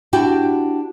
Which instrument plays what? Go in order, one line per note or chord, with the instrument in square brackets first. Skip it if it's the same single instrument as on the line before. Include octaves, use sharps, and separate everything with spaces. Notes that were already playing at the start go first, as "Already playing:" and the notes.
[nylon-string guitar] D4 E4 F#4 G4 G5